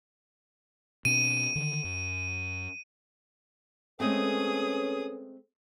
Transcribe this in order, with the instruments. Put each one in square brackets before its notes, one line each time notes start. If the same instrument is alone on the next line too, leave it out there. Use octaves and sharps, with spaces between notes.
[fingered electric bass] B2 C4 D4 [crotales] D#7
[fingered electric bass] D3 D#3
F#2
[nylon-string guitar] G#3 A3 C4 [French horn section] C#4 A4 B4 [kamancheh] G#4 D#6